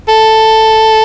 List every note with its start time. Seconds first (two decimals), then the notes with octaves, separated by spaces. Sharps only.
0.09 A4